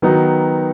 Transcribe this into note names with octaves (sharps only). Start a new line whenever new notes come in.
D#3 F#3 B3 D#4